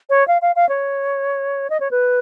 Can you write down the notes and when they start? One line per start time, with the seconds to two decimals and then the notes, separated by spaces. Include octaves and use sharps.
0.10 C#5
0.28 F5
0.42 F5
0.56 F5
0.69 C#5
1.70 D#5
1.80 C#5
1.91 B4